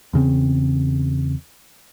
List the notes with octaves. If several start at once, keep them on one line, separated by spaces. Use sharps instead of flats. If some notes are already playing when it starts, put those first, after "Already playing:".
E2 C#3 C4